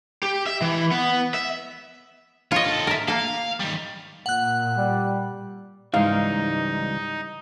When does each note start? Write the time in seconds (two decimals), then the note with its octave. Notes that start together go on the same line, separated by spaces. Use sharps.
0.23 G4
0.46 E5
0.61 E3
0.91 B3
1.34 E5
2.52 F4 C#5 D#5
2.65 D#3 A4
2.87 A#4 E5
3.08 A#3 A4 F5
3.60 D#3 G3
4.26 A#2 F#5 F#6
4.77 G3
5.94 C#2 G#2 E3 G3 D#4 F5